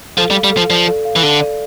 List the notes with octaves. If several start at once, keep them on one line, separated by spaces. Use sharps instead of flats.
F3 A4
G3
F5
G3
F3 A4
F3 D5
A4
F5
E3
D3 A4
D5